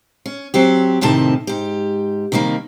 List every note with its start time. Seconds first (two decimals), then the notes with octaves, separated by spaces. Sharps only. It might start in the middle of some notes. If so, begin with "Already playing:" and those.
0.26 C#4
0.54 F#3 C4 G4
1.01 F2 A2 C3 D#3 A5
1.47 G#2 G4
2.32 C3 D#3 G3 G#3 A#3